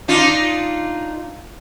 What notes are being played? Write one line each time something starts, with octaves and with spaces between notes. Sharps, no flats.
D4 D#4 F4